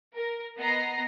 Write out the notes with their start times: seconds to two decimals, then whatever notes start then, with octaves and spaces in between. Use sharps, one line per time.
0.15 A#4
0.57 B3 D#5 A#5 C7